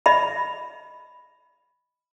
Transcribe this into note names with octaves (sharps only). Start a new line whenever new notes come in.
D#5 E5 B5